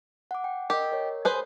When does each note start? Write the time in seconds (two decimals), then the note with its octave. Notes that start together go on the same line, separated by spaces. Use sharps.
0.31 F#5 D6
0.44 G5
0.70 G4 A#4 D#5
0.92 A#4 C#5
1.25 G#4 B4 C5